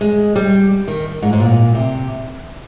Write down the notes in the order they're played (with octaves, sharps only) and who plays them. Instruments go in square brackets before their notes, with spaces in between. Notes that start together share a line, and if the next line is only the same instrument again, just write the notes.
[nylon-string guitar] G#3
G3
D#3
G#2
G#2
A#2
C3